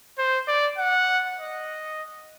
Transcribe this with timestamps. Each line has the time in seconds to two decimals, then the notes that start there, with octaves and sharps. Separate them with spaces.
0.18 C5
0.48 D5
0.78 F#5
1.39 D#5